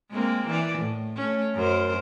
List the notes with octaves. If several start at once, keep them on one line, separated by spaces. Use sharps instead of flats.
G#3 A#3 C4
E3 D5
A2
A3 C#4
F#2 A#4 C5